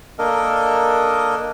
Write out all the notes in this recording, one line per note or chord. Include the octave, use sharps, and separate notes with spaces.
A#3 D4 A4 A#4 D#5